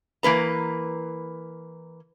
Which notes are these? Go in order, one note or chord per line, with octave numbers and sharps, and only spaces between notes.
E3 A#3 B4 A#5